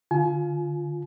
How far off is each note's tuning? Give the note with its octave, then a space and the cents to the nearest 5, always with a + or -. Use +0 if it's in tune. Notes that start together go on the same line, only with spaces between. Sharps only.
D3 +10 F4 +0 G#5 +35